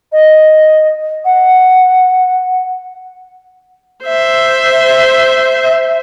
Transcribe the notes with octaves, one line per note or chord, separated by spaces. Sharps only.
D#5
F#5
C5 E5